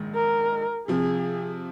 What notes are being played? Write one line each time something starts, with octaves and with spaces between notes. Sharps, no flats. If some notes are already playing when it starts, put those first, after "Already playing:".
Already playing: A#1 G#2 D#3 G#3
A#4
C3 F3 C4 G#4